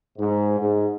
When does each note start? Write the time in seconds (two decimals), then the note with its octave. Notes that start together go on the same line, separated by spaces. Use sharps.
0.18 G#2
0.59 G#2